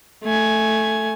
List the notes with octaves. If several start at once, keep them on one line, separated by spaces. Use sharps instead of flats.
A3 G#5